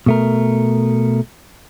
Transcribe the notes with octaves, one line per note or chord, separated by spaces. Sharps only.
B2 A3 A#4